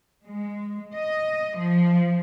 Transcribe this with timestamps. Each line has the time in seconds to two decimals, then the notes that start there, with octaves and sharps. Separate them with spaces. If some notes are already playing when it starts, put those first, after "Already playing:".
0.25 G#3
0.94 D#5
1.58 F3